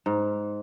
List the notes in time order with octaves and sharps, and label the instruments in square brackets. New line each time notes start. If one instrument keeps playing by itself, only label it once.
[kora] G#2